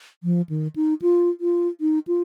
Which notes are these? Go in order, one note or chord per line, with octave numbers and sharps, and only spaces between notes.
F3
D#3
D#4
F4
F4
D#4
F4